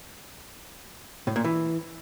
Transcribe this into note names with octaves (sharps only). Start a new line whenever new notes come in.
A2
A#2
E3